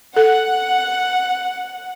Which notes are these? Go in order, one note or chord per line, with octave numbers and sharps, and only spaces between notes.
A4 F#5